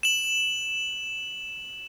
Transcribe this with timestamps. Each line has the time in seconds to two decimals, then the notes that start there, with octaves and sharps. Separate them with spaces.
0.03 E7 F#7